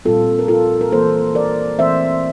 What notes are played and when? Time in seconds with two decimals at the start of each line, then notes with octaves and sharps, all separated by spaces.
0.05 A#2 G3 C4 F4 A4
0.39 A#4
0.48 F4 A4
0.81 A#4
0.92 E3 A#3 A4 C5
1.35 A#4 D5
1.79 E3 A3 C4 C5 E5